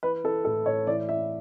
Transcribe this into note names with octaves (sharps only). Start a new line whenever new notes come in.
E3 B4
E3 A4
A2 A4
A2 C#5
E3 D5
E3 E5